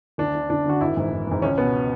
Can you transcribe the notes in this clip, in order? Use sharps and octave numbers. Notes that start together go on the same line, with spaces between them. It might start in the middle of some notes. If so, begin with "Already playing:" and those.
D2 D4
D3
D2 D4
D3 F#4
G#1 E4
G#2 E3
G#1
G#2 E3
C#2 C#4
B2 B3